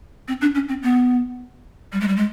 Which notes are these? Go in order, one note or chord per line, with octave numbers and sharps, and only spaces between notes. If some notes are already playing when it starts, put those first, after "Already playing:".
C4
D4
C#4
C4
B3
G3
G#3
G3
G#3